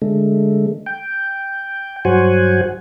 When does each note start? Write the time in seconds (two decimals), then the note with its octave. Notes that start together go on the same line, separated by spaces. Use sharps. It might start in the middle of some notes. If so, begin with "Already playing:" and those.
0.02 D3 G#3 A3
0.86 G5
2.05 G2 F#3 F#4 C5 F#5 G#5